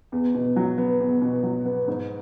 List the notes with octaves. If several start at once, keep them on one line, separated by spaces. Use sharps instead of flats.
E2
B2
F#3
B3
E2
B2
F#3
B3
G#2